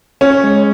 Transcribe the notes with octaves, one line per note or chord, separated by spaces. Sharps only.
C#4 C#5
G#3